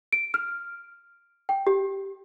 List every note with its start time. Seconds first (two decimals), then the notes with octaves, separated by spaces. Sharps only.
0.13 D7
0.34 F6
1.49 G5
1.67 G4